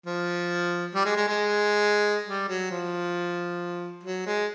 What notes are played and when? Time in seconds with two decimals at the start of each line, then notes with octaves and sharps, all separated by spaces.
0.06 F3
0.94 G3
1.05 G#3
1.16 G#3
1.27 G#3
2.27 G3
2.48 F#3
2.71 F3
4.03 F#3
4.26 G#3